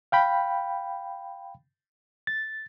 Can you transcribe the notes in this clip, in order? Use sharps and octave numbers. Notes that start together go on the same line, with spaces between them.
F5 G5 B5
A6